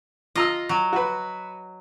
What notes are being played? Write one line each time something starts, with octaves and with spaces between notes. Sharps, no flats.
F4 D#5 A#5 E6
F#3
F#4 B4